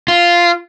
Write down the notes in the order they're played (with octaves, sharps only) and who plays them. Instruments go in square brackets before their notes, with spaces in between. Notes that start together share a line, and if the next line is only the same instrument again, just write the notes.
[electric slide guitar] F4